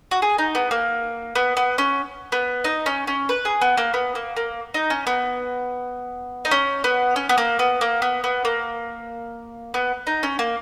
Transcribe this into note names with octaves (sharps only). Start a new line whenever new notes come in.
F#4
G#4
D#4
B3
A#3
B3
B3
C#4
B3
D#4
C#4
C#4
B4
G#4
B3
A#3
B3
A#3
A#3
D#4
C#4
B3
D#4
C#4
B3
C#4
B3
A#3
B3
A#3
B3
B3
A#3
B3
D#4
C#4
A#3